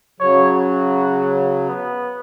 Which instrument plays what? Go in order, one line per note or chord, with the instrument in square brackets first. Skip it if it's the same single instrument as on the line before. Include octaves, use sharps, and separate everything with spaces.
[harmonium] C#3 F#3 [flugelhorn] C#5
[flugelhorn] F#4
B3